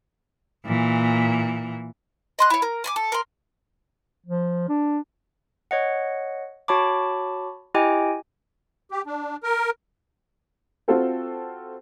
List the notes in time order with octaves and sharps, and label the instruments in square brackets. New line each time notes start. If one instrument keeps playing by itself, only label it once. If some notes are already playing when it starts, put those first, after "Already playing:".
[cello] A#2 E3
[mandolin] D#5 C6 F#6
E4 C#5
A#4
G#5 B5 D6
A4
A#4 C6
[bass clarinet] F3
D4
[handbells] C#5 D#5 F#5
F#4 C#5 A5 B5 D6
E4 G4 D#5 G5 G#5
[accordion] G4
D4
A#4
[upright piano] C4 F4 F#4 A4 C5